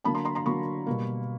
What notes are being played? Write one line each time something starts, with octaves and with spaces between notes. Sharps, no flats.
D3 F#3 A#3 A5 B5
A#5 C6
A#5 C6
A#5 C6
D3 F#3 A#3 B5 C#6
B2 G3 A#3